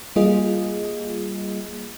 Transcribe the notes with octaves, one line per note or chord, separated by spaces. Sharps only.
G3 A#3 F4 G#4 D#5